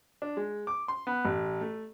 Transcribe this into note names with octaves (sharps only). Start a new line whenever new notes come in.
D4
G#3
D6
C6
B3
A1
A3